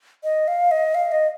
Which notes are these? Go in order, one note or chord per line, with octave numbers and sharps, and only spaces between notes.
D#5
F5
D#5
F5
D#5